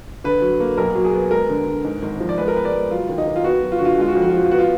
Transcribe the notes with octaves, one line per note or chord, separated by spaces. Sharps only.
D3 B4
F#3
A#3
B1 A#4
F#3
G#4
B3
G#3 A#4
D3
D3
G#2
G#1
F3
D5
G#3 B4
A#4
B3 B4
D5
G#3
F#3 F4
D#2
D#4
D#2
F4
B3 F#4
F#3
F4
D3 F#4
F4
F#4
G#3 F4
F#4
F2 F4
F#4
F4
F3 F#4
F4
B3 F#4
F4